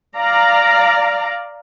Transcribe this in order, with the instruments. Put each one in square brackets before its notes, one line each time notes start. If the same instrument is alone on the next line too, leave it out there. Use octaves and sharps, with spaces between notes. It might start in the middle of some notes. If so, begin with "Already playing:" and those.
[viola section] D5 F5 A#5